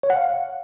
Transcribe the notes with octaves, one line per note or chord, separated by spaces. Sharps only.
C#5
F#5
F5